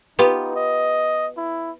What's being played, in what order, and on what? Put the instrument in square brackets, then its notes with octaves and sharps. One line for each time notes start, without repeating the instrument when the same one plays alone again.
[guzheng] B3 F4 G4 [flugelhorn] D#4
[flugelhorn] D#5
E4